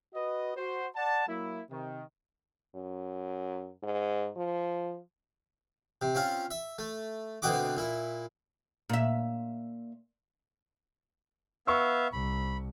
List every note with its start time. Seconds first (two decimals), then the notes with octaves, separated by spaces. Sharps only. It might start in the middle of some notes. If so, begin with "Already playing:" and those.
0.14 F#4 B4 D#5
0.57 F#4 C5
0.95 D5 F#5 A5
1.28 F#3 A#3 E4
1.70 C3 D#3
2.75 F#2
3.83 G#2
4.37 F3
6.01 C3
6.15 C4 C#4 F4
6.51 E5
6.79 A3
7.42 D2 B2 C4 F#4 D#5 D6
7.77 A#2 E4
8.89 A#2 E5
11.67 B3 E5 F5 C#6 E6
12.13 C2 B5